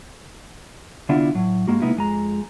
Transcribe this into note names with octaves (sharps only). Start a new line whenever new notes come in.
C2 D3 B3 D4 E4 F4
A2 F#3
G2 G#3 A#3 F#4
C3 G#3 A#3 B3 D#4 E4
F2 G#3 A#5